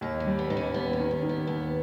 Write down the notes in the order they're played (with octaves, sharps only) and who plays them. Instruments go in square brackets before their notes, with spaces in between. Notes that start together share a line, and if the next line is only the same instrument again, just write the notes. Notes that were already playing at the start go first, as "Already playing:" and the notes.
[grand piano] D#2 [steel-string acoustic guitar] D#4
[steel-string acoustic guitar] C#4
[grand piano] G3
[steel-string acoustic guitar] B3
[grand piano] D#2 [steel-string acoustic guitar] D#4
[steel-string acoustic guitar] C#4
[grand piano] D#2 [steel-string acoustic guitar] B3
[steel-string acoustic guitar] C#4
[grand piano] D#3
[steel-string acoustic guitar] C#4
[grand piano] D#3
[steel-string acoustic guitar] B3
[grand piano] D#2 [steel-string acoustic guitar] B3